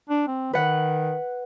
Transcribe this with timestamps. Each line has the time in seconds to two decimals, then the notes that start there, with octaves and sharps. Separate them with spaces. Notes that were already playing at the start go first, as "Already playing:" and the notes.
0.09 D4
0.27 C4
0.53 D#3 B4 F#5